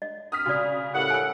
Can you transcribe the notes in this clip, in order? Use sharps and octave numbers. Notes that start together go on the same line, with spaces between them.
D#5
D#6 F6 B6
C#3 F#4 D5
A2 G3 A#4 F#5
G#5 E6